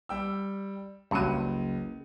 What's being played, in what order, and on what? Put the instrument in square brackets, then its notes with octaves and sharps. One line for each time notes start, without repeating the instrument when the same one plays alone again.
[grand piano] G3 G5 E6
[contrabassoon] F#1 [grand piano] C#2 C#7 D#7 [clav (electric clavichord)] G2 F#3